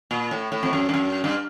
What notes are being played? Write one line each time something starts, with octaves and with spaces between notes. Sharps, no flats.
A#2
A2
A2
F2
F#2
G2
F#2
G2